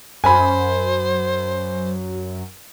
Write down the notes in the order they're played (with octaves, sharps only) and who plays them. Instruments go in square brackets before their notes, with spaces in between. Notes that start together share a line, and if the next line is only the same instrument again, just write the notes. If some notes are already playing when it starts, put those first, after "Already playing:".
[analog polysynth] F#2 [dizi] C5 [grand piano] G#5 B5